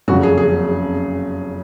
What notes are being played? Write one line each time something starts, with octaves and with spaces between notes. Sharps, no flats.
F#1 F2 C#3 F#4
G#4
G#4